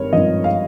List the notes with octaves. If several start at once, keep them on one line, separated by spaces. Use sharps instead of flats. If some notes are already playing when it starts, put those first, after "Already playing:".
Already playing: G#1 G2 A#4 C#5
G#1 G2 F3 D#5
F5